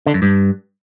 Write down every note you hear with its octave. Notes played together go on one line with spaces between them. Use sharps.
D3
F#2
G2